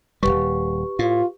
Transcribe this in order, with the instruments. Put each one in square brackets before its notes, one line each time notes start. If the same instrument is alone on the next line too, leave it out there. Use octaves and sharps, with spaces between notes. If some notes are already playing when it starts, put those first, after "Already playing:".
[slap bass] D#1 G#1 G3 [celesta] G4 B4 C#6
[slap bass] A2 [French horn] F4